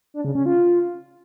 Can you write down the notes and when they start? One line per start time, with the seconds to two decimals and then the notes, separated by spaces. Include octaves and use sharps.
0.14 D4
0.24 C#3
0.35 C#4
0.46 F4